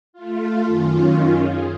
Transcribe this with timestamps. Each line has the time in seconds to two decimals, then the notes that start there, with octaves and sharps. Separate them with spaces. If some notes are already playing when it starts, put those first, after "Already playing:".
0.13 A3 F4
0.66 F#2 D#3 C#4 F4
1.38 G#4